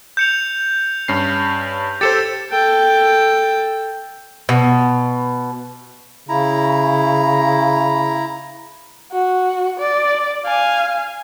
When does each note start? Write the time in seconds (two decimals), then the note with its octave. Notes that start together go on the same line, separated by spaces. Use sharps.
0.17 G6 C#7 F7
1.08 G2 C#4 C7
2.01 G4 A4 C5 A6 C#7 E7
2.50 A4 G5
4.49 B2
6.29 C#3 E4 A#5
9.12 F#4
9.79 D5
10.46 F5 G#5